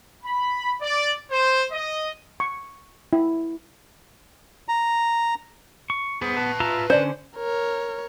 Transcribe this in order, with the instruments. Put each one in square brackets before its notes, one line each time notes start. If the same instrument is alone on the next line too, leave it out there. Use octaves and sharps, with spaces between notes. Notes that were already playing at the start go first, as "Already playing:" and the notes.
[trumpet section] B5
D5
C5
D#5
[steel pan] C#6
E4
[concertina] A#5
[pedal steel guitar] C#6
[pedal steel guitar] B3 [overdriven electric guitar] G#4 C5
[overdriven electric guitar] B4 A5
[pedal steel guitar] F4 E5 A#5
[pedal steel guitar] D3 C#4 [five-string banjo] C5 D5
[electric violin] A#4 C#5